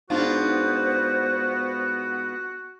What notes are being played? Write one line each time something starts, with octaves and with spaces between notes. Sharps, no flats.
G#2 B3 D4 F4 F#4 C5